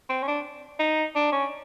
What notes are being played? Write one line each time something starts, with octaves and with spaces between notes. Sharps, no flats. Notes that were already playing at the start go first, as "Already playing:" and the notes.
C4
C#4
D4
D#4
D4
C#4